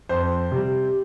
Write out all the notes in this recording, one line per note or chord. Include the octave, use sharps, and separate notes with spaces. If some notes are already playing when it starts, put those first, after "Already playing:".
F2 C5
C3 G3